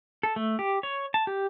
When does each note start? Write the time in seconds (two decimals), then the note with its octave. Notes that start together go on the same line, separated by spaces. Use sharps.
0.23 A4
0.36 A3
0.59 G4
0.83 C#5
1.14 A5
1.27 G4